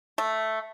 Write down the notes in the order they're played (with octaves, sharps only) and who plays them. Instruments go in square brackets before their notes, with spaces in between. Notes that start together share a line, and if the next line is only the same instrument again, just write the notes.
[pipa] A3